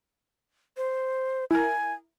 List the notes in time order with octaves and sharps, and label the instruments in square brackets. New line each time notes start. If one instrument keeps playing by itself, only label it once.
[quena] C5
[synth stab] E4 A#4 [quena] G#5